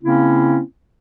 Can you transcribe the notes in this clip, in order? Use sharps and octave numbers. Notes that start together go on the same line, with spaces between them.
C#3 A#3 C4 C#4 E4